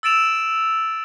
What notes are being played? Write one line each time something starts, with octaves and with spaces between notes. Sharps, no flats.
E6 A6 D7 E7 F7